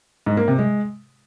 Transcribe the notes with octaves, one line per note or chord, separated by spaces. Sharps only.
G#2
A#3
C3
G#3